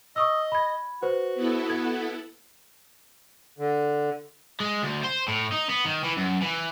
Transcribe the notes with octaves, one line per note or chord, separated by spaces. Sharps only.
D#5 C#6 D#6 E6
B5 G#6
F#4 B4 C5
B3 E4 A4
G#6
D3
G#3
D2
C5
A2
D#4
B3
D#3
E3
F#2
E3